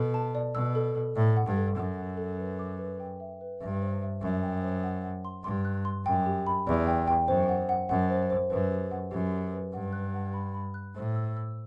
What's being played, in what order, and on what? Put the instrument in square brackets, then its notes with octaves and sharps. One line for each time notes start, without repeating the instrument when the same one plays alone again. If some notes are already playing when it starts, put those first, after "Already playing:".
Already playing: [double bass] B2 [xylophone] A4
[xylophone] A5
D5
[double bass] B2 [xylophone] E6
[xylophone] A4
A4
[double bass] A2 [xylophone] D5
[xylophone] F#5
[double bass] G2
[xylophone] A4
[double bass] F#2 [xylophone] F#5
[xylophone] F#5
A4
B4
D6
B4
G5
E5
B4
[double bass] G2 [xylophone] E5
[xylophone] C5
E5
[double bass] F#2 [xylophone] E5
[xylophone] G5
C5
F#5
F#5
C6
[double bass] G2 [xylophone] C6
[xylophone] F#6
C6
[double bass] F#2 [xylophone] G5
[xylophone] G4
B5
[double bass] E2 [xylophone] D5
[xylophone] G5
G5
[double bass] F#2 [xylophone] C5
[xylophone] F#5
F#5
[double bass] F#2 [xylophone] F#5
[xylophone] C5
C5
[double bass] F#2 [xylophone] B4
[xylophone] G4
F#5
[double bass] F#2 [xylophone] G4
[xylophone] G4
B4
[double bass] G2 [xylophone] F#5
[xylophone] F#6
F#5
B5
B5
F#6
[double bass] A2 [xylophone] C5
[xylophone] E6
E6